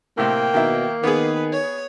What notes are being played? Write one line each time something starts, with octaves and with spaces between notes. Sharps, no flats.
A2 C3 A#3 G5
B2 D#3 E4
D#3 B3 G#4 B4
C#5